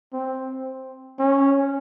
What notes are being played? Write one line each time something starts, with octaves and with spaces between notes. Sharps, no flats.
C4
C#4